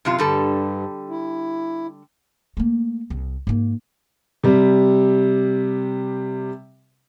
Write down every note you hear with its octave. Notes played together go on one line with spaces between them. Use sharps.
F#2 C3 F4
G2 D3 G3 A4
E4
A3 A#3
C2
G#2 A#3
C3 G3